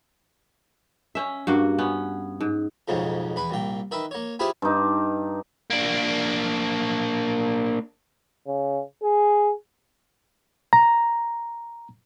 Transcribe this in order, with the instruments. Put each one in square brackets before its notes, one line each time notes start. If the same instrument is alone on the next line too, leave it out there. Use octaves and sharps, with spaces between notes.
[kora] C#4 E5
G2 A#3 F#4
B3 C#4
G#2
[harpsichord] B1 F2 G#2 C#3 F3
E2 B4 B5
C2 A#2 G5
D#3 B4 E5 B5
A#3 C#5
E4 F4 G4 G#4 B4 C5
[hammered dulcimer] G2 D#4
[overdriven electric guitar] A#3 D4
[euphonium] C#3
G#4
[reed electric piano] A#5